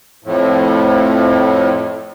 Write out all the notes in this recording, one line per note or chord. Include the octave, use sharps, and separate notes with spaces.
F2 A2